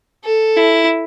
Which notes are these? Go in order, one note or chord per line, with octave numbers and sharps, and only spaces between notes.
A4
E4